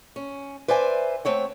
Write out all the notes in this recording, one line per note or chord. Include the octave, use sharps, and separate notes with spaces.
C#4
B4 C5 D5 E5 G#5
A3 C4 C#5 F#5